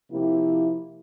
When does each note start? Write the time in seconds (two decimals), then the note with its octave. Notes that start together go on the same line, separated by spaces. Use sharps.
0.10 C3 F3 A#3 E4 G4